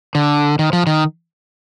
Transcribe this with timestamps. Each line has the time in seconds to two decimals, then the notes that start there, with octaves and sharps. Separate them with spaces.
0.15 D3
0.59 D#3
0.73 F3
0.87 D#3